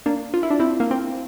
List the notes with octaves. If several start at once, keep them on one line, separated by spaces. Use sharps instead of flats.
A#3 D4
F4
E4
D4
C4 E4
A#3
C4